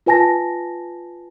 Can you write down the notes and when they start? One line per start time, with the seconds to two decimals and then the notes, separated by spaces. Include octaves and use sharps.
0.06 F4 B4 G#5 A5 A#6